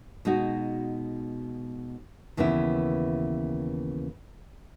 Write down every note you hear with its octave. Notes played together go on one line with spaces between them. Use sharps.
B2 G#3 D#4 F#4
D#2 C#3 E3 B3 E4